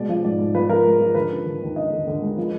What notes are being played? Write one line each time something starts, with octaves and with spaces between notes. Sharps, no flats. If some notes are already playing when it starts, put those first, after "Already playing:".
Already playing: B2 G#3 D5
F3
G#2 D5
G#2
F3 B4
F3 A#4
G#3
F3
D3 B4
D4
D3
D#2
D4 D#5
D3
D3
G#3
F3